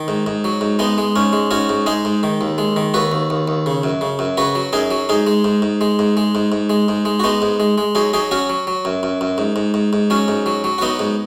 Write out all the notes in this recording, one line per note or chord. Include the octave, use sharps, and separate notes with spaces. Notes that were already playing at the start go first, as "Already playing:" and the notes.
Already playing: D#3
G#2
G#2
F#3
G#2
G#3 B3 D#4
G#3
G#2 C#4
G#3
G#2 C#4 F#4
G#2
G#3 D#4 G#4
G#2
D#3
D#2
G#3
D#3
D#2 F#4 B4
D#2
D#2
D#2
C#3
F#2
C#3
F#2
C#3 F#4 B4
F#3
F#2 D#4 G#4
F#3
G#2 D#4 G#4
G#3
G#2
G#2
G#3
G#2
G#3
G#2
G#2
G#3
G#2
G#3
F#4
G#3 B3 D#4
G#2
G#3
G#3
F#3 D#4 G#4
F#3 D#4 G#4
F#3 C#4 F#4
F#3
F#3
F#2
F#2
F#2
G#2
G#2
G#2
G#2
F#3 C#4
G#2
F#3
F#3
F#4
F#3 B3 D#4
G#2